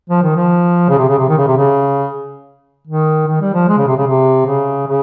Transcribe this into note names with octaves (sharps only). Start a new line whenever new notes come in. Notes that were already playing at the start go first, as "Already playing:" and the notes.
F3
D#3
F3
C#3
C3
C#3
C3
D#3
C#3
C3
C#3
D#3
D#3
G3
F3
G#3
C#3
C3
C#3
C3
C#3
C#3